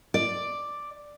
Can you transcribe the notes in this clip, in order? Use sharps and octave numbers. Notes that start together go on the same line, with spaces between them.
D5